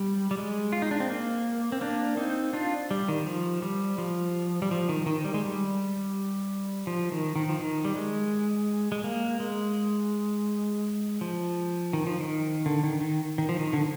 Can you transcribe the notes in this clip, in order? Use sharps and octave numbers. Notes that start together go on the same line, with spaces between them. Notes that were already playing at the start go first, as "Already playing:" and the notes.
Already playing: G3
G3
G#3
F4
D#4
D4
C4
A#3
C4
A#3 D4
C4 D#4
D4 F4
G3
D#3
F3
G3
F3
G3
F3
D#3
D#3
G3
G#3
G3
F3
D#3
D#3
F3
D#3
G3
G#3
G#3
A#3
G#3
F3
D#3
F3
D#3
D3
D#3
D#3
D#3
F3
D#3
D3